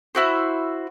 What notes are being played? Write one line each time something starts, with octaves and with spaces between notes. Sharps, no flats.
E4 F#4 C5